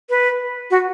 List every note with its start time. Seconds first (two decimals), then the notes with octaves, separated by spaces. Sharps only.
0.10 B4
0.71 F#4